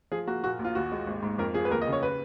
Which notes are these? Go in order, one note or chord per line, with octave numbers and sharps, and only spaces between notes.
F3 G#4
A#3 F#4
A#2 F#4
A#1
F4
D#2 F#4
G#3
G#1
G#2
F2 A#4
F3 G#4
B4
D#2 A#4
D#5
C#3
C#5
B4